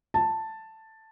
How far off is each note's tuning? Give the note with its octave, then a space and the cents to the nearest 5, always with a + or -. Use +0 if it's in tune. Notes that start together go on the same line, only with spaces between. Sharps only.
A5 +5